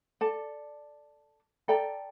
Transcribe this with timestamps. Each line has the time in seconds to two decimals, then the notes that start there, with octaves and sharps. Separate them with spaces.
0.21 A4 D5 A5
1.68 A4 D5 G5 A#5